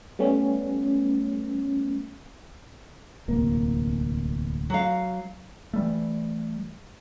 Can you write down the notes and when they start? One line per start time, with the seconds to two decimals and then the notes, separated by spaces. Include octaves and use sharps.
0.19 G3 A3 B3 C#4
3.28 D1 C2 A#3
4.70 F#3 F5
5.73 E3 G3 A3